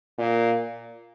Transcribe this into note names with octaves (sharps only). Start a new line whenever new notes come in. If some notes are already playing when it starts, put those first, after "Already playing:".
A#2